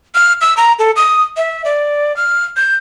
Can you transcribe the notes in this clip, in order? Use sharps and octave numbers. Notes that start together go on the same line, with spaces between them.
F6
E6
A#5
A4
D#6
E5
D5
F6
G6